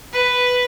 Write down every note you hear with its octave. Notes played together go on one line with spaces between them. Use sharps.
B4